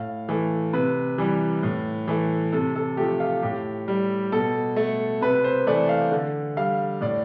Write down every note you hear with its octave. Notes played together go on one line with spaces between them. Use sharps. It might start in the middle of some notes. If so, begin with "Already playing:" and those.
Already playing: A2 F5
E3 A3
C3 B4
E3 G3
A2
E3 A3
C3 A4
A4
F3 A3 G4
F4
A2 G4
G3
B2 A4
A3
C3 B4
C5
E3 A3 D5
F5
D3
G3 F5
A2 D5